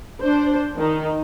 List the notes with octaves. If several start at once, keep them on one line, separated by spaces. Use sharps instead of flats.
D4 C5
D#3 D#4